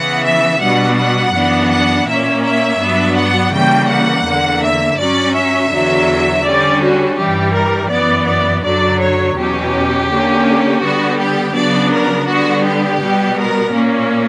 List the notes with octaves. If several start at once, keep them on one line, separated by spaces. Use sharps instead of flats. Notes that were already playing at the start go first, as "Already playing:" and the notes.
Already playing: C#3 E3 B3 F#5
E5
B2 G3 B3 D4 F#5
F#5
F#2 E3 B3 D4
F#5
A#2 A#3 C#4 E5
E5
G2 F#3 B3 D4
F#5
C#3 E3 G3 A#3 G5
F#5
E2 D3 A#3
E5
G2 F#3 C#4 D5
E5
E2 D3 F#3
D3 G3 C#4 D5
F#4
G2 E3 G3 G4
A#4
F#2 E3 B3 D5
D5
F#2 D3 F#3 D5
C#5
E2 B2 F#3 C#4 G4
D3 A#3 C#4
D3 G3 B3 F#4
G4
C#3 F#3 B3 D4 D5
A#4
D3 G3 B3 F#4
G4
B2 G3 B3
A#4
A#2 A#3 C#4